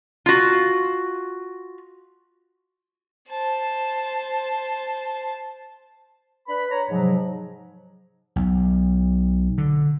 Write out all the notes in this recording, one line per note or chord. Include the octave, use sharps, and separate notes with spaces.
F4 F#4
C5 A5
D4 B4 B5
C#5 A#5
G#2 C3 F3 F#3
B1
D3